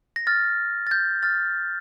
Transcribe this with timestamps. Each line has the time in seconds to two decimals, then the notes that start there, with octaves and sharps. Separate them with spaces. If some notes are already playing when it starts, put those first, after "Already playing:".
0.16 A#6
0.27 F6 A6
0.87 A6
0.91 G6
1.23 F6 A6